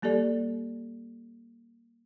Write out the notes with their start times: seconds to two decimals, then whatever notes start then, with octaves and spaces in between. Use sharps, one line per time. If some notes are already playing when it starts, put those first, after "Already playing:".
0.02 G3 A#3 G4 A4 D5